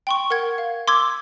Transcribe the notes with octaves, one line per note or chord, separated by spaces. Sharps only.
G5 C6 C#6
A#4 F#5 G#6
F5
C6 D6 E6 G#6